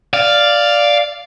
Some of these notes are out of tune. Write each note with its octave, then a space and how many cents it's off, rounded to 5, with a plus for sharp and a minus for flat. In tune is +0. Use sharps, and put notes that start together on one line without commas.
D5 +0 F5 +0